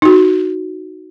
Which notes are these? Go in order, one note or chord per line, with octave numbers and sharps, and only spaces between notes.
D#4 F#4